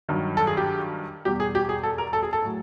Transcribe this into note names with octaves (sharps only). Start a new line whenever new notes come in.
G2 D#3 F#3
A4
G#4
G4
E2 B2 G3 G4
G#4
G4
G#4
A4
A#4
A4
G#4
A4
A2 F#3